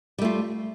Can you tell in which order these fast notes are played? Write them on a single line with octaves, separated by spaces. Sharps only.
G3 A3 F4